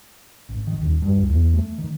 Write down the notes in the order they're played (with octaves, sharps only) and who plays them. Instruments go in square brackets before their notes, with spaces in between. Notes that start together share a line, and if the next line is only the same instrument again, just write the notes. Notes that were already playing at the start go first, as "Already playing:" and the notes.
[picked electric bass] G#1
D#3
D#1
G2
C#2
E2
A3
D#3